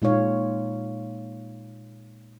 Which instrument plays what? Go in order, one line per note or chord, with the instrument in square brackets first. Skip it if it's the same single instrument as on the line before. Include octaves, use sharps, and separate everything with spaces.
[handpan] A#2 G#3 D#4 F4 C#5 F5